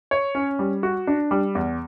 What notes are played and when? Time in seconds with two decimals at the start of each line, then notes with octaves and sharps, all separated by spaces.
0.11 C#5
0.35 C#4
0.59 G3
0.83 F#4
1.07 D4
1.31 G3
1.55 E2